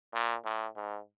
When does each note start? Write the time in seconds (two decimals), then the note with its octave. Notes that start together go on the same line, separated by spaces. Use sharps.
0.13 A#2
0.45 A2
0.76 G#2